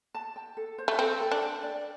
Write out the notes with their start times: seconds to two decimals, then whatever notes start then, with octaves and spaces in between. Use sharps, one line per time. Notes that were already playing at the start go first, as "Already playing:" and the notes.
0.15 A5
0.36 G5
0.57 A4
0.78 C5
0.88 A3
0.99 C4 A4
1.21 A4
1.31 D4
1.42 G5
1.63 D5